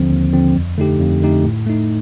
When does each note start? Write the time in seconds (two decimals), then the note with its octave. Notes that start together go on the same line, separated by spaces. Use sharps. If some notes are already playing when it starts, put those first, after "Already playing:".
Already playing: D#2 D3 F3 C4
0.10 D#2
0.33 D3 F3 C4
0.55 F2
0.78 D3 A3 D#4 G4
1.00 F2
1.22 D3 A3 D#4 G4
1.45 A2
1.66 A3 D#4